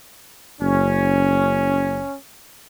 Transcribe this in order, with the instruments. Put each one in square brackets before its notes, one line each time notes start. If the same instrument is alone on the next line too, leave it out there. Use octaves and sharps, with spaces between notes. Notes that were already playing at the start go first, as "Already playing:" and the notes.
[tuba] F#1 [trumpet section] C#4